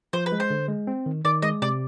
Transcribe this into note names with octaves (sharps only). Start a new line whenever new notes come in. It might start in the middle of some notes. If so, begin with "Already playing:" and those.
F3 C5
B4
G#3
C5
D3
G#3
C4
D#3
D#3 D5
G#3 D#5
C3 D5